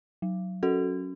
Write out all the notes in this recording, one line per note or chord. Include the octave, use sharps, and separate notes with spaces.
F#3
C#4 F#4 A4